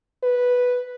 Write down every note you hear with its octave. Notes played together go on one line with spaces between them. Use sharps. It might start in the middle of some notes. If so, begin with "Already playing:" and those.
B4